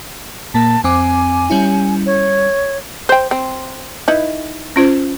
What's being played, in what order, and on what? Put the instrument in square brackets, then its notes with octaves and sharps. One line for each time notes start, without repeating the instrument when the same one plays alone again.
[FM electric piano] A#2 A#3 [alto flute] A5
[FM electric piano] F2 C4 D6 [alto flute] G#5
[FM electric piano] G3 C#4 E4
[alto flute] C#5
[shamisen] C5 G5
C4
D#4 E4 B4
[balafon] C#4 F4 C5